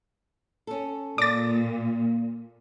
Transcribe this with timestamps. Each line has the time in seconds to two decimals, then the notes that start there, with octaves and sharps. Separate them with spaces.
0.67 C#4 A4
1.18 A#2 D5 D6 A6